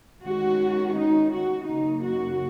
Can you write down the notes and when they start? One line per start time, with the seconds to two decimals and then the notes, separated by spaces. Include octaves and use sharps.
0.24 D#3 G#3 C#4 F#4
0.96 D#4
1.31 F#4
1.66 F#2 C#3 A#3 D#4
2.02 F#4